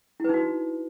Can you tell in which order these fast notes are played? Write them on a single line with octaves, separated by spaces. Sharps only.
E4 B4 D#4 F#4